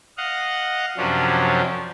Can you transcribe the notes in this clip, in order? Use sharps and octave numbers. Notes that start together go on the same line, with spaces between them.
D#5 F5 F#5
F#2 C3 F3 F#3 C#4 D4